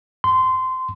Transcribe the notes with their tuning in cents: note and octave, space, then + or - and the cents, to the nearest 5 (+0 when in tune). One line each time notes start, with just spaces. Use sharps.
C6 -20